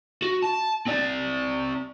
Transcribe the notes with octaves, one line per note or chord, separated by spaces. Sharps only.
F#4
A5
C4 D5